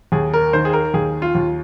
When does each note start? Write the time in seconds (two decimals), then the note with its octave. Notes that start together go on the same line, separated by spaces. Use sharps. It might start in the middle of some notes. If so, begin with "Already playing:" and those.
0.12 D#2 G#4
0.33 A#4
0.53 D#3 C5
0.65 G#4
0.73 A#4
0.94 D#2 G#4
1.22 F4
1.35 D#2